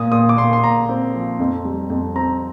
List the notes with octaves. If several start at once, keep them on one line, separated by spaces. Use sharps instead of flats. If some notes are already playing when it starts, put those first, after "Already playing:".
Already playing: A#2 D#6
A#2 D#6
D6
A#2 C6
C6
A#2 A#5
C4
F3
F2
G3
F2
C4 A#5